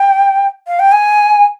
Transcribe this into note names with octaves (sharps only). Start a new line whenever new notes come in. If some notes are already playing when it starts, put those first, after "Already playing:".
Already playing: G5
F5
G5
G#5